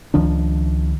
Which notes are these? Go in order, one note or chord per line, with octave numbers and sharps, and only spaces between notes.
C#2 D#3 F3 D4